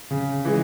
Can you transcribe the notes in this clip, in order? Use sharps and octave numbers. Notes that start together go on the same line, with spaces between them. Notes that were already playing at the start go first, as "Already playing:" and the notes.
C#3
E3 G#3